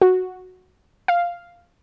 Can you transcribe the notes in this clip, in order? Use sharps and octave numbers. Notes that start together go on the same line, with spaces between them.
F#4
F5